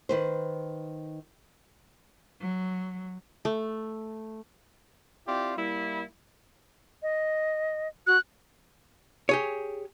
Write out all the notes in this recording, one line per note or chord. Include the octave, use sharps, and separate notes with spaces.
D#3 B4 C5
F#3
A3
C4 E4 F4 G4 D5
G3 A#3 E4
D#5
F#4 F#6
G4 G#4 C#5